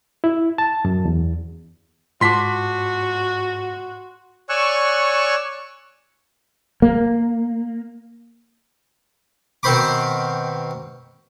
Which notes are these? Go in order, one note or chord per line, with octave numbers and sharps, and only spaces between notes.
E4
A5
F#2
E2
G#2 F4 F#4 A5 C6 D6 B6
C#5 D5 G#5 C#6 E6 F#6
A#3
B2 D#3 C4 C5 B5 D6